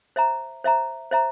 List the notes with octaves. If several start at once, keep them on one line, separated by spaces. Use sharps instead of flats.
C5 E5 A#5
C5 E5 A#5
C5 E5 A#5